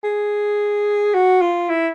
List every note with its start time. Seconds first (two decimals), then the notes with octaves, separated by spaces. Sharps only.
0.04 G#4
1.14 F#4
1.42 F4
1.69 E4